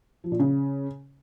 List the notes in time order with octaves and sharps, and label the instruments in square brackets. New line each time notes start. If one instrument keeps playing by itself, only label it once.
[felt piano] F3
A#2
C#3